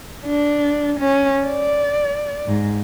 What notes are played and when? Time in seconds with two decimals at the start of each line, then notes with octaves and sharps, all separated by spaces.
0.26 D4
1.00 C#4
1.46 D5
2.47 G#2